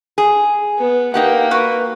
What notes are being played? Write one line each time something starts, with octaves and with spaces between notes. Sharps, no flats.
G#4
B3
A#3 D#4 G4 F#5
F#4 B4